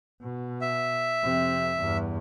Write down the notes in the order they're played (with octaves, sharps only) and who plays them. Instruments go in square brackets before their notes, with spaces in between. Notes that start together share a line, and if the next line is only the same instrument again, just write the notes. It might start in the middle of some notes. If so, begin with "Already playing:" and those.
[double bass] B2
[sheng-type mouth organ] E5
[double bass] F2 C3
E2 G2